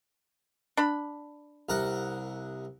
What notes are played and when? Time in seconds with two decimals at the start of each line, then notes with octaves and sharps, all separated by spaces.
0.77 D4 B5
1.69 C2 A#4 F#5